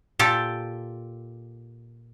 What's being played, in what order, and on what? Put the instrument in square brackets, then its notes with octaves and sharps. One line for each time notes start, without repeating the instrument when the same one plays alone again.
[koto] A#2 G4 A4